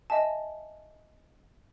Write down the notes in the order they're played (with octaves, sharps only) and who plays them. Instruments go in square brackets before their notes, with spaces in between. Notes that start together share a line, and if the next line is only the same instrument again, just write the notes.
[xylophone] D#5 E5 G#5 A5